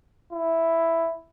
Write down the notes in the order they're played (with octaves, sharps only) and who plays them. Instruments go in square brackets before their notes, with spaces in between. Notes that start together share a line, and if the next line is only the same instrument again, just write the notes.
[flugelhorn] E4